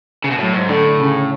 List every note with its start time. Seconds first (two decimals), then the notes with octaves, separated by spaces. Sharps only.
0.24 C#3
0.31 B2
0.37 A2 F#3
0.53 G#2
0.68 A2 D3
1.00 C#3